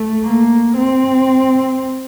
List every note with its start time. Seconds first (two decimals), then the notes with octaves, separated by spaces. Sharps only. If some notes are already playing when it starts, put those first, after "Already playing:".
Already playing: A3
0.24 A#3
0.77 C4